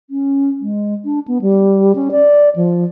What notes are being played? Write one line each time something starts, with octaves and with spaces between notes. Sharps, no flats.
C#4
G#3
D4
B3
G3
C#4
D5
F3